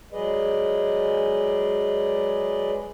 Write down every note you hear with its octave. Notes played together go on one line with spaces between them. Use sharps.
F#3 G#3 G#4 B4 D5 D#5